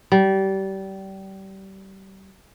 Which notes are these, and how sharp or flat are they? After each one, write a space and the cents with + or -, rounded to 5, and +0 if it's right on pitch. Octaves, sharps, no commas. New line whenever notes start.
G3 -25